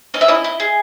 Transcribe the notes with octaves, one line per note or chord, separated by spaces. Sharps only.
C#4 D#5
E5
E4 D#5
E4
G#4